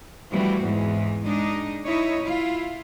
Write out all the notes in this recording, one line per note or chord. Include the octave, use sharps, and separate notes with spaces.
E3 F3 G3 A3 C4 F#4
E2 G#2 E3 G#3
G#3 D4 D#4 D#5
D#4 E4 C#5 D#5
E4 F4